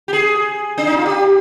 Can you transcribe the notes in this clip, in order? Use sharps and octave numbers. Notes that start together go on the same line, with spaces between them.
G4
G#4
D4
D#4
F4
G4